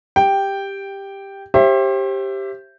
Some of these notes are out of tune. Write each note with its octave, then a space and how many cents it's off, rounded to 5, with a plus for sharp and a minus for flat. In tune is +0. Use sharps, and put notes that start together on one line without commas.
G4 +10 G5 +0
G4 +0 C5 +35 E5 +20